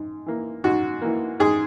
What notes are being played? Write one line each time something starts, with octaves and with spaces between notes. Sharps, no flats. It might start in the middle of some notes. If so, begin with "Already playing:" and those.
Already playing: G#2
E3 A#3
G#2 F#4
E3 A#3
G#2 G#4